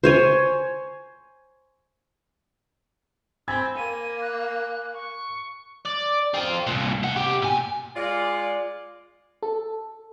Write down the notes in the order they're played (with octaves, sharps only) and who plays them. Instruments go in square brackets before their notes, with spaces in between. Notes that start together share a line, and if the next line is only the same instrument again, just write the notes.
[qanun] C5 C#5 G#5
[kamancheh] C4 [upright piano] G#5 B5 G#6 [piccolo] E6
[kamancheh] A#3 [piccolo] D#7
[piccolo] F#6
C#6
[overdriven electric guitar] D5
C4 F4
C2 A#2
A3 F#5
C3 G4
A#2 G#5
[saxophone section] G#3 F4 D5
[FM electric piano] A4